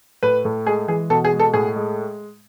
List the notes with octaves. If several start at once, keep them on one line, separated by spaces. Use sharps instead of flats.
A2 B4
A2
G#3 G#4
E3 G#4
B2 A4
G#4
G#3
A4
A2 G#4
G#3